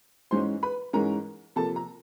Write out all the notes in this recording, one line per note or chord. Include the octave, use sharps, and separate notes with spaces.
G#2 E3 G#3 C#4 C5 C6
B4 B5
G#2 E3 G#3 C#4 A#4 A#5
C3 F3 A#3 A4 A5
A#5